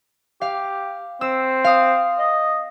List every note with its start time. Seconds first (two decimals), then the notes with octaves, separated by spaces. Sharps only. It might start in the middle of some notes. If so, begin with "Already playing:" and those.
0.41 G4 F5
1.21 C4 E6
1.64 F5 D#6
2.18 D#5